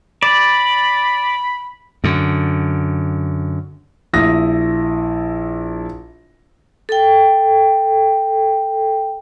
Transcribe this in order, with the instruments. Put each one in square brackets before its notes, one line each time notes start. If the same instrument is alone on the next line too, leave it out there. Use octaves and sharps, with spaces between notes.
[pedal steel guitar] D5 [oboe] B5
[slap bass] F#2 D3
[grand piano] A#1 E4 D#6 A#6
[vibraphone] A4 G5